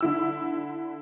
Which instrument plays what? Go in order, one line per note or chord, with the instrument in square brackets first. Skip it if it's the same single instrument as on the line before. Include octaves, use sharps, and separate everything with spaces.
[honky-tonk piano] D3 E4 E6